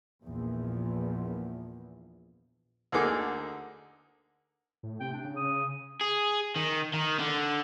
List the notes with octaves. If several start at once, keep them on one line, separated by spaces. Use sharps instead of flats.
A#1 E2
D2 D3 A#3 D#4 G#4 D6
A2
C3 G5
D4
C#3
D#6
G#4
D#3
D#3
D3